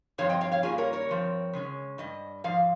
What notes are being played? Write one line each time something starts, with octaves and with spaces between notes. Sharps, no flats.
G2 F3 C4 C#5 F5
D#5 G5
C#5 F5
C#5 F5
G2 G3 A#3 C#4 F4 G#4
A#4 C#5
A#4 C#5
G2 F3 C4
C#3 G#3 C#4
G2 G3 D#5
G#2 F3 F5